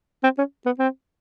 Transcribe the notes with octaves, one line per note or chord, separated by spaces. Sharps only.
C4
C#4
B3
C4